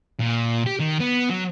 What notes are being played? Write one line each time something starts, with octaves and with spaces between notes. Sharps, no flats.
A#2
G4
D#3
B3
F#3